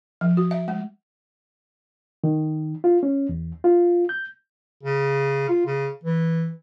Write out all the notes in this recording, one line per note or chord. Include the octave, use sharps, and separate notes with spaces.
F3
F#4
E5
G#3
D#3
F4
C#4
E2
F4
G6
C#3
F4
C#3
E3